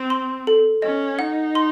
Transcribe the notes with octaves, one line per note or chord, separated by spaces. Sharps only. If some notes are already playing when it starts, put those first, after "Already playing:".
Already playing: C4
C6
A4
C#4 D#5
D#4 F#5
C6